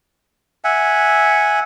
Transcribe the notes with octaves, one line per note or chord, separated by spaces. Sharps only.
E5 F#5 G#5